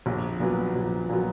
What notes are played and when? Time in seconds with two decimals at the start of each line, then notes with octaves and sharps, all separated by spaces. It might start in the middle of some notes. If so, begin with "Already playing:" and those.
0.06 A#1
0.40 A#2 F#3 B3
0.75 A#1
1.09 A#2 F#3 B3